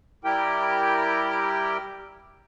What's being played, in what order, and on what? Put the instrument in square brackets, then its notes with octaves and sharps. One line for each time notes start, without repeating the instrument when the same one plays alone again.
[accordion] G3 E4 G4 A#4 G5